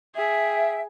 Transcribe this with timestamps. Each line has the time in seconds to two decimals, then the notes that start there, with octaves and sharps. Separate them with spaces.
0.16 G#4 E5 G5